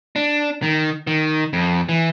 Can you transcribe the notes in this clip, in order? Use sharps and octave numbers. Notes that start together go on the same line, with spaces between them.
D4
D#3
D#3
F2
E3